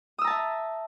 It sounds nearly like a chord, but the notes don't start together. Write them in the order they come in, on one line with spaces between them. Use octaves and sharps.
D#6 E6 A#5 A5 E5